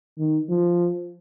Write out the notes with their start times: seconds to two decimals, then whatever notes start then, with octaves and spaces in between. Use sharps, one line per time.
0.19 D#3
0.49 F3